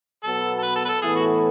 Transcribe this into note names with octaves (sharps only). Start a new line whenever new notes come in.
B2 F#3 B3 A4
A4
B4
A4
B4
A4
A2 E3 B3 E4 G#4 A4
F#4